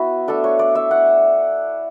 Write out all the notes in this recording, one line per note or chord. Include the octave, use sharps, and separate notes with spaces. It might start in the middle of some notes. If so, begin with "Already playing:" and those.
Already playing: B3 E4 F#4 B4 E5
A3 D4 A4
C#5
D5
E5
F#5